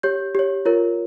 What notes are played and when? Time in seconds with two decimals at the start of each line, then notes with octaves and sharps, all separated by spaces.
0.03 G4 C#5 G6
0.35 G4 C#5
0.65 F4 A#4 C#5